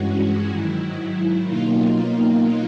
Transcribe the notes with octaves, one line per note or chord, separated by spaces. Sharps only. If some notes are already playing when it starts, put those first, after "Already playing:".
Already playing: G2 E3 G#3 C#4 F#4
G#2 D#3 F#3 E4
B2 F#3 A#3 D#4 F4